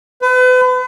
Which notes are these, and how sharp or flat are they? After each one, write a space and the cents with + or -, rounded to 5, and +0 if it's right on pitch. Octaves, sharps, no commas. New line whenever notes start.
B4 +40